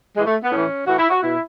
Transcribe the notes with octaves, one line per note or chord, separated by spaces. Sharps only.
A2 E3 G#3
A3
B3
A2 E3 C#4
A2 E3 F#4
E4
F#4
B2 E4